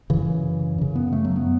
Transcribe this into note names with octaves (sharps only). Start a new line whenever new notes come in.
F#2 C#3 E3
F#2 C#3
B3
A3
F#3
B3